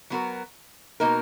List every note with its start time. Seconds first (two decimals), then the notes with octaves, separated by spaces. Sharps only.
0.10 F#3 B3 F#4 A#4
1.00 B2 A#3 D#4 A#4